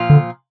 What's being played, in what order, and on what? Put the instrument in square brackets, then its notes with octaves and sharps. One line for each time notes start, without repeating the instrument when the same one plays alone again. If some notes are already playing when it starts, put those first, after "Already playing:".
Already playing: [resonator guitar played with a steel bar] A#2 F3 F4
[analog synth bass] D3